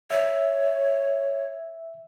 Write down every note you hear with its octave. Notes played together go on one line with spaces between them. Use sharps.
C#5 E5